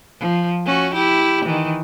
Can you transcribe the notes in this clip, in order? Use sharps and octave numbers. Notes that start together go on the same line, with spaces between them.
F3
C#4 F#4
E4 G4
D#3 E3